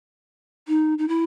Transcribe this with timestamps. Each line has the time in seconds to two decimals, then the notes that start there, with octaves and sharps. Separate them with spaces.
0.68 D#4
0.98 D#4
1.08 E4